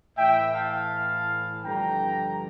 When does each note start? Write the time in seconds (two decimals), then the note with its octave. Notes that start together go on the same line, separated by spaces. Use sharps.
0.16 A2 E3 E5 G5
0.53 F5 A5
1.65 G2 D3 F3 G5 A#5